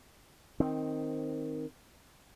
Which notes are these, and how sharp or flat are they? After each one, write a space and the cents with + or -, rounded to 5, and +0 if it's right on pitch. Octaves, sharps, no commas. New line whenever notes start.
D#3 +0 C4 +5